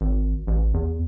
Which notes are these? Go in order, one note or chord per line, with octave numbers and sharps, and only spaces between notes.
G#1
A1
E2